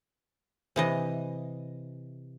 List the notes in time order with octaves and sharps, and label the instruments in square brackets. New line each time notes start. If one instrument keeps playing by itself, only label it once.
[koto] C3 E3 D#5